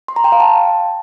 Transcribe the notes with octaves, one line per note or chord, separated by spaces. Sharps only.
C6
A#5
G5
F5
A5